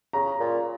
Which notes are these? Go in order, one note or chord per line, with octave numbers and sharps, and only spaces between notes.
C#3 A#5
A#2